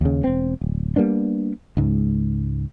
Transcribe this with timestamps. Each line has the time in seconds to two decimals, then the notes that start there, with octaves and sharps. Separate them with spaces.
0.01 D#2 C#3
0.24 E1 C4
0.61 D1
0.96 G3 A#3 B3 D4
1.77 C#2 G#2